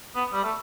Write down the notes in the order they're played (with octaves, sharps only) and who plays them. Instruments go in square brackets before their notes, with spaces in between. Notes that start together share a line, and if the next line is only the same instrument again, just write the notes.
[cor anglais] B3
G3
A3